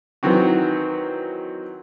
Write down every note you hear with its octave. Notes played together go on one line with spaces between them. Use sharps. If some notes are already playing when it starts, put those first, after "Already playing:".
D#3 E3 F#3 C4 F#4